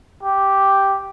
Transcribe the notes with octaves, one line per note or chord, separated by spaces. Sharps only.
G4